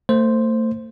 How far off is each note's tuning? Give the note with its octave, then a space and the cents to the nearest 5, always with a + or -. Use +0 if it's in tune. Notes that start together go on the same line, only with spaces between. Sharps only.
A3 +35 C5 +0